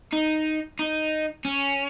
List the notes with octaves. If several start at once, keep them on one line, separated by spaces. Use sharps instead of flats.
D#4
D#4
C#4